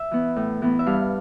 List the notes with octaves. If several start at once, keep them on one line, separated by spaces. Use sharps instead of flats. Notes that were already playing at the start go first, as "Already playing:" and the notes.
Already playing: E5
E3 B3
A2
E3 B3
E5
G2 F5